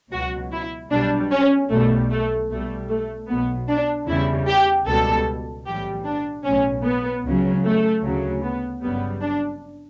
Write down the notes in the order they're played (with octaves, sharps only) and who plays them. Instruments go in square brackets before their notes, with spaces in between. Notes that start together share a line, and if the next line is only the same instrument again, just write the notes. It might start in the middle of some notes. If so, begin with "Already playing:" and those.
[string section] C#2 B2 F#3 F#4
E4
B1 B2 G3 D4
C#4
B1 B2 G3 A3
A3
B1 B2 G3 A3
A3
B1 B2 F#3 B3
D4
E2 C#3 G3 E4
G4
C#2 B2 G3 A4
B1 A2 E3 G3 G4
D4
B1 A2 F#3 C#4
B3
C#2 C#3 F#3
A3
D2 C#3 F#3
B3
G1 F#2 C#3 G3 B3
D4